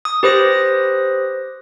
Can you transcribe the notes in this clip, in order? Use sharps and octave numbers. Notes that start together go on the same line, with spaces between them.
D#6
G4 B4 C5 D#6 A#6